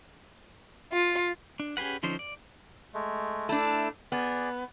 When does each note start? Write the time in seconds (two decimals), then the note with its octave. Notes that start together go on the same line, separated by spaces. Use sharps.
0.93 F4
1.60 D4
1.77 C#4 G4 G#4 B4 F#5
2.03 D3 F3 C#4 D#4 C5
2.19 D5
2.94 G#3 A3
3.49 A3 D4 E4 A5
4.12 B3 G#4 D5